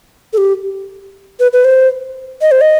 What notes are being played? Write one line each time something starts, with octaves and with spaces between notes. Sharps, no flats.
A4
G4
B4
B4
C5
D#5
C5
D#5